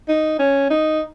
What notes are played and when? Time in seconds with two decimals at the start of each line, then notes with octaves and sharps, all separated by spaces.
0.08 D#4
0.39 C#4
0.70 D#4